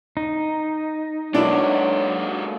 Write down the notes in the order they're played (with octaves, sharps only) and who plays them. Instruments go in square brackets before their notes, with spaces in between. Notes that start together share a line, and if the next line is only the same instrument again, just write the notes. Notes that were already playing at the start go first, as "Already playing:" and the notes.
[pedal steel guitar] D#4
[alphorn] F#3 [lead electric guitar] G#3 A#3 [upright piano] D4 E4